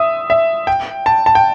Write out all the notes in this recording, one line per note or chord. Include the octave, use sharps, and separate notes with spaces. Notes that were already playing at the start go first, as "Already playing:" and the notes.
Already playing: E5 D#6 E6
E5
G5
A5
A5
G5